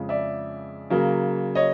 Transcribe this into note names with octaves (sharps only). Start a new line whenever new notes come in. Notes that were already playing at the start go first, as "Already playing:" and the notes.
Already playing: F2 C#3 F3 G#3
D5 E5
C#3 F#3 A#3
C#5 D#5